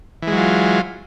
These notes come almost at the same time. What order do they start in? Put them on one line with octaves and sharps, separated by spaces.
E3 G#3 F#3 F4